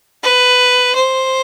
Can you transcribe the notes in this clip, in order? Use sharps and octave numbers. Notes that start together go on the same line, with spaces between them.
B4
C5